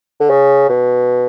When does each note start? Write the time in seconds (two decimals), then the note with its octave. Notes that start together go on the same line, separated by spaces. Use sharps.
0.20 D3
0.30 C#3
0.69 B2